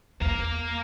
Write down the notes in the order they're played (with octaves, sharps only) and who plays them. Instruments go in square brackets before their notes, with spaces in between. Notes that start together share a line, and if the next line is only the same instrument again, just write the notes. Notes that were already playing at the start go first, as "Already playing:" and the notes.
[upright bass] E2 [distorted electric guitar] A#3 F5